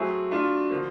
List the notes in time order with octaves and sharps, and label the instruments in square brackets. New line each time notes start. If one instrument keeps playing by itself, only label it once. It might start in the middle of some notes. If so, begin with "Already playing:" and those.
Already playing: [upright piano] F#3 A3 C4 E4 G#4 [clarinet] F#4
[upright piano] A3 D4 F4
D3 F3 A#3